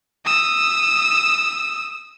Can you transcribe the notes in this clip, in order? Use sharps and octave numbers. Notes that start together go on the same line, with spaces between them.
D#6 E6